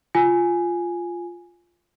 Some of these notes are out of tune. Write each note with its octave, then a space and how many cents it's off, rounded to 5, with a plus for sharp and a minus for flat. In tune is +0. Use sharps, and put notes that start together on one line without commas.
F4 +0 G#5 +0